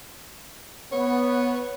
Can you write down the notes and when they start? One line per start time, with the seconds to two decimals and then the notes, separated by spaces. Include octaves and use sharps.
0.92 B3 C#5